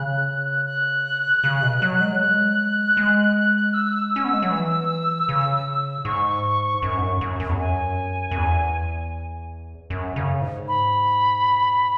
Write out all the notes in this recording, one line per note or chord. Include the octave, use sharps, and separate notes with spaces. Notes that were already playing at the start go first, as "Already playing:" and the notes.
Already playing: C#3 F#6
F#6
C#3
B2
F#3
G#3
F#3
G#3 F#6
G#3
E6
C#4
B3
G#3
F#3
E3
C#3
G#2 C#6
F#2
G#2
F#2
F#2
F#2
E2
F#2 G#5
F#2
E2
F#2
C#3
G#2
B5